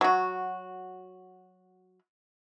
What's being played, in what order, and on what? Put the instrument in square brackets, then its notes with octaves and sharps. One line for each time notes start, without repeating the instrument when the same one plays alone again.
[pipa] F#3 F#4